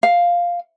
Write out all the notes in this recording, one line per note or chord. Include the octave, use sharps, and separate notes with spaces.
F5